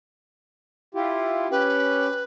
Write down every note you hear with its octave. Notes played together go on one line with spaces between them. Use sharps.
E4 F4 G4
C#4 G4 B4